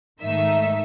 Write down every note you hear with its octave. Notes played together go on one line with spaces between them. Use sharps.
G#2 D#3 A3 D#4 E5